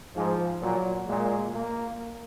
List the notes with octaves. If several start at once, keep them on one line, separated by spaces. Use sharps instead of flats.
G#2 F3
A#2 F#3
A#2 G#3
A#3